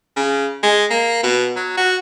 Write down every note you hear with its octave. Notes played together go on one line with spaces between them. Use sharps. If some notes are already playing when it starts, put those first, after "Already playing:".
C#3
G#3
A#3
B2
F#3
F#4